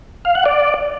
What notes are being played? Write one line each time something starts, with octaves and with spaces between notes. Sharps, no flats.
F5
F#5
D5